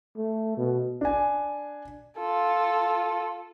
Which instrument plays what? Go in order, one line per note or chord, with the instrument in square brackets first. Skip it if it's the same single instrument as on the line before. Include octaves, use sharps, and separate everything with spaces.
[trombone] A3
B2
[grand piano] D4 G#5
[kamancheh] F4 A4